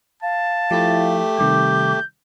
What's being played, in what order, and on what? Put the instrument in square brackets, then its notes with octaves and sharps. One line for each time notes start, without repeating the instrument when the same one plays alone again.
[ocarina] F5 [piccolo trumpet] A5
[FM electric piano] F3 E4 [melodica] A3 G4
[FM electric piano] C3 D#3 G3 [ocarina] D6 [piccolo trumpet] G6